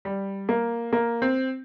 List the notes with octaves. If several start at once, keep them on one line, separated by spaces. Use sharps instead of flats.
G3
A#3
A#3
C4